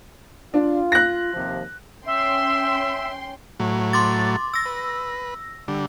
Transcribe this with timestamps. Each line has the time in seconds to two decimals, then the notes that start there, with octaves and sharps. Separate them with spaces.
0.54 D4 F4
0.92 F#6 A#6
1.34 D#2 C3 F3
2.06 C#4 E5 G5 C6
3.60 A2 F#3
3.93 C6 D6 A6
4.54 E6 A#6
4.66 B4
5.68 D3 G3